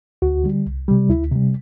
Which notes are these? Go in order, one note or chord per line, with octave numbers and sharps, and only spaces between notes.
D2 F#4
D3 G3
C2
C3 G3
D2 E4
C3 G3